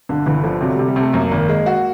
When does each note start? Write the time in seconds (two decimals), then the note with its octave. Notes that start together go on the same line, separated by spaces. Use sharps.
0.09 G1 D3
0.26 G1 E3
0.44 D3 F3
0.61 C3 F#3
0.75 G3
0.79 C3
0.88 G3
0.96 C3 A3
1.14 F#2 A#3
1.31 G#1
1.49 G#3
1.66 F#4